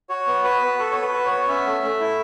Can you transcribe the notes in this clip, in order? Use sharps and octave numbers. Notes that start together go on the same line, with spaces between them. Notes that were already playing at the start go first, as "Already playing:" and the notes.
F#4 C#5
B3
F#4 B4
B3
F#4 A4
B3 C#5
B4
F#4
C#5
B3
C#4 E5
A3
A3
E4